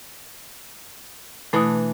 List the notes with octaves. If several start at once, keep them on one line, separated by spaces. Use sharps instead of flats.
B2 E3 A3 D4